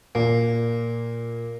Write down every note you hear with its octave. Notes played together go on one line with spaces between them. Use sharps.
A#2 A#3